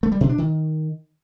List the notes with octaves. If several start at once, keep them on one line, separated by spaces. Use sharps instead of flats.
A3
G3
B2
D4
D#3